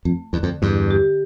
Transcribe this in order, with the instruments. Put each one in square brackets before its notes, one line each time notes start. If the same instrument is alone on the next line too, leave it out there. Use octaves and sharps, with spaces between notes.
[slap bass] F2 [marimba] A3
[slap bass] E2 [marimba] D3
[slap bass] F2
[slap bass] E2 G2 [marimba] D3
[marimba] G4